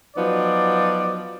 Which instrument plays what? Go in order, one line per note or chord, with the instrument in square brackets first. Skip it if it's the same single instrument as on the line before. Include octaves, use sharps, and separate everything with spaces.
[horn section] F3 F#3 B3 D#4 D5